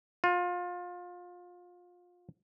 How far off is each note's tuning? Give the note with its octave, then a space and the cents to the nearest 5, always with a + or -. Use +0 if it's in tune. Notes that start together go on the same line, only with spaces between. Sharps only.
F4 +25